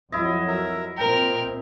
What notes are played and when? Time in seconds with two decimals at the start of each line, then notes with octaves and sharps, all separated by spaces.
0.12 F2 F#3 E4 D#5
0.48 A#4 E5
0.98 A#2 C4 A#4 G5